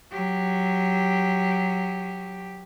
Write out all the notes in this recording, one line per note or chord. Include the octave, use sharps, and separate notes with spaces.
F#3 G4